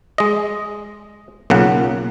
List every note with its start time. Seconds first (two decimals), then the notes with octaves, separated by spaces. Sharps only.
0.18 G#3 D#5
1.50 B1 C#3 A#3 C#4 F4 F#5